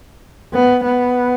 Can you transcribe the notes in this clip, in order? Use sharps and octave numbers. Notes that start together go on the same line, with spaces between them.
B3
B3